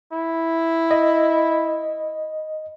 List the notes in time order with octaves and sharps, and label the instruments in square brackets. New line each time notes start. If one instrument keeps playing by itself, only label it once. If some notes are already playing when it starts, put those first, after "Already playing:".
[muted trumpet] E4
[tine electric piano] D#5